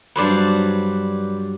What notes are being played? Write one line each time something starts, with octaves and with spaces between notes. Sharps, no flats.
G2 F#3 F#4 B4 C5 D5